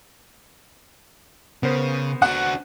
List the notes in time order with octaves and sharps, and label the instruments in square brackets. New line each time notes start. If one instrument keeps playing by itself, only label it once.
[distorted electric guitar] C#3 [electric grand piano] B3 A#4 C5
[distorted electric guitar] D4 F#4 [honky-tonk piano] F#5